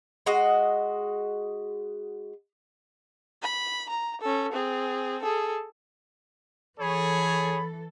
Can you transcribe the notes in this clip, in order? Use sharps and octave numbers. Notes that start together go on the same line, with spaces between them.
G#3 F#4 D#5
B5
A#5
C#4 A4
C4 G#4
G#4 A4
E3 G#4 A4 C#5 B5